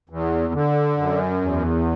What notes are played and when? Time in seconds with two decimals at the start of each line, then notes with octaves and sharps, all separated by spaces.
0.09 E2
0.53 D3
0.97 F#2
1.41 E2